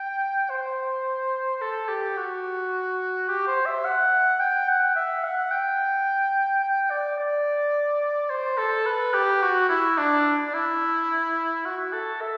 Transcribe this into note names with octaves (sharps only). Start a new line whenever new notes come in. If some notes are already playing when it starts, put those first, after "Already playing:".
Already playing: G5
C5
A4
G4
F#4
G4
C5
E5
F#5
G5
F#5
E5
F#5
G5
G5
D5
D5
C5
A4
B4
G4
F#4
E4
D4
D4
E4
F#4
A4
E5